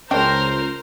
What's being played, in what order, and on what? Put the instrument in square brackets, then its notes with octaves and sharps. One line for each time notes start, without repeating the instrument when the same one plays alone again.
[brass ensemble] C#2 [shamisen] C#4 D4 G5 [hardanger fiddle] A#4 [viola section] C5 A#5